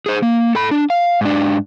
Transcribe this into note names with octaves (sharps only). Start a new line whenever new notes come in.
G#4 C5
A#3
A4 B5
D4
F5
G#2 D4